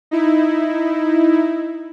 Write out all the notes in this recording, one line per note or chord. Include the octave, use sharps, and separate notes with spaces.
D#4 E4